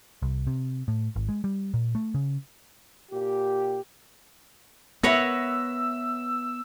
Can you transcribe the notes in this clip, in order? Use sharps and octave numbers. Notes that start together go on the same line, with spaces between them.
C2
C3
A2
G#1
G#3
G3
A#2
A3
C#3
A#2 G4
B3 B4 C#5 E5 F#5 E6 A#6